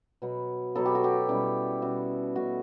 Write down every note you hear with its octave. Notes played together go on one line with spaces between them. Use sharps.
B2 F#3 B3
B2 F#3 B3 A4
G4
F#4
G4
B2 G3 C#4 E4
B2 G3 C#4 E4 F#4
B2 A3 C#4 F#4